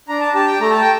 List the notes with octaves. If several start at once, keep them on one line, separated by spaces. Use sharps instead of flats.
D4 A#5
A5
G4 A5
G5
A3 A#5
A5
G5